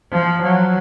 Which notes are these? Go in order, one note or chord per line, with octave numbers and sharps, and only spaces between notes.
F3
F#3